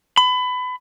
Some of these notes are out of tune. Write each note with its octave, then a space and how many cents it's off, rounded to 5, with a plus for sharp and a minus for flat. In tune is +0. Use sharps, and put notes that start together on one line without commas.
B5 +25